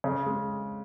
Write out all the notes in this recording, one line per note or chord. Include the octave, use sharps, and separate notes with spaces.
C#3
G#3